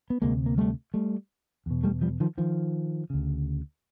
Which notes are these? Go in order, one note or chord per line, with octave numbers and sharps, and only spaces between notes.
B3
D2 C3 G#3 A#3
A#3
G3 A3
G3 A3
E2 B2
G3 A3
F3 G3
D#3 F3
D#3 F3
D2 C#3